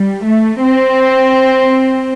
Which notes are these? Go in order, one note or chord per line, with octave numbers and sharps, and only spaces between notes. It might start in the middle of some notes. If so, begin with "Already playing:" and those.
Already playing: G3
A3
C4